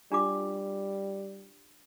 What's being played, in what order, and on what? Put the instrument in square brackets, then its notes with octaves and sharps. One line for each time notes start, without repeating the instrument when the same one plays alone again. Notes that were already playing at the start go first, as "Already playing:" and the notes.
[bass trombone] G3 [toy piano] D4 F4 D6